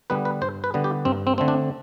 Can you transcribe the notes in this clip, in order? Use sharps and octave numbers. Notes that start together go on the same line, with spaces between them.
D3 G3 B3 B4
B4
G2 C5
B4
D3 G3 B3
G4
G2 C4
C4
D3 A3 C4
D4